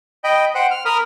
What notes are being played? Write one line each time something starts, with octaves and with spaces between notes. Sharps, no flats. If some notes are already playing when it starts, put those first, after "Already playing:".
D#5 G5 B5
C5 F#5 G5
F6
A#4 B5 D#6 F6